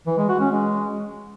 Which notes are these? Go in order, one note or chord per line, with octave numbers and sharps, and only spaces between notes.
E3
G#3
F#4
C#4
G#3